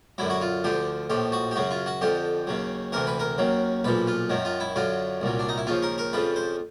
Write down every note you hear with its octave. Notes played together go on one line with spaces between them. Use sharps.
F#2 D3 F#3 E4
F#4
F4
D2 D3 F3 G4
A#1 A2 F3 G4
F#4
G4
F#2 C#3 F#3 F#4
F4
F#4
F2 D3 F3 G4
D#2 C#3 F#3
D2 C3 E3 A#4
B4
A#4
D#2 C#3 F#3
B1 A#2 F3 B4
F4
F#2 D#3 F#3
F4
E4
F#2 D3 F#3 F4
C2 A#2 F#3
D4
D#4
E4
D#2 C#3 F3 F4
A#4
A#4
F2 C#3 F3 B4
C5